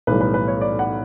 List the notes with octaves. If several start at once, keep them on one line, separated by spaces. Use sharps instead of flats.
B1 A2 E3 G3 B4
B4
B4
C#5
D5
F#5